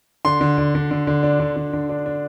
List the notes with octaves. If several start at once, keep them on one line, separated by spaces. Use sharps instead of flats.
D3 C6
D3
D3
D3
D3
D3
D4
D3
D3
D3
D4
D4